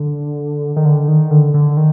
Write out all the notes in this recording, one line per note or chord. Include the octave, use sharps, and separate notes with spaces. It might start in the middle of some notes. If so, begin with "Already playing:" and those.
Already playing: D3
D#3
D3
D#3
D3
D3
D#3